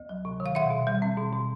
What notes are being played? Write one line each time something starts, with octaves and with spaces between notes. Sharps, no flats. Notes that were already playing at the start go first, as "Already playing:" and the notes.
Already playing: D2
F#3
C3
D#3
F5
B2 E5 F#5
B2
G3
C4
B2
B2